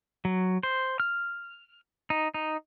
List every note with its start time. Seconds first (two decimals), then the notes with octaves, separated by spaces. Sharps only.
0.25 F#3
0.63 C5
1.00 F6
2.10 D#4
2.34 D#4